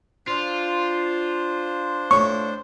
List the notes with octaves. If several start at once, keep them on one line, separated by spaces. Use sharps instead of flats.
D4 F4 C5
A2 C#5 C#6